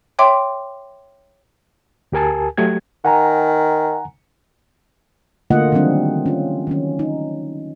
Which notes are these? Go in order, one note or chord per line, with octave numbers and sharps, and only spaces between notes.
C#5 E5 G5 C6 D6
D2 G4 A#4 G#5 A5
F#3 A3 G4 G#6
D#3 F#5 G#5 A#5
D3 A3 A#3 F4 D#5 F#5
D#3 E3 F#3 G3 C4 D4
C#4 F4
D#3 F#3 C#4
D#4